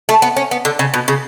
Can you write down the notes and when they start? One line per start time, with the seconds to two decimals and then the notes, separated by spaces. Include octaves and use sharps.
0.09 A3
0.22 B3
0.37 C#4
0.51 B3
0.65 D3
0.79 C#3
0.94 B2
1.08 C#3